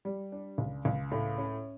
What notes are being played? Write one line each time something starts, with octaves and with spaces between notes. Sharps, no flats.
G3
D4
C#2
C#2
A2
C#4